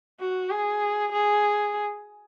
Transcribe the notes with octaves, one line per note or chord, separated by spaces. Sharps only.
F#4
G#4
G#4